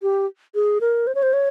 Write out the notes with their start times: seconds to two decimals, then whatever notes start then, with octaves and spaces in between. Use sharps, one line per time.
0.02 G4
0.55 G#4
0.81 A#4
1.07 C5
1.15 C#5
1.23 C5
1.33 C#5